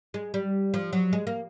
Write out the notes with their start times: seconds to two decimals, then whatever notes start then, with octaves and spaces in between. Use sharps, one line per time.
0.14 G#3
0.34 G3
0.74 F3
0.93 F#3
1.13 G#3
1.27 A#3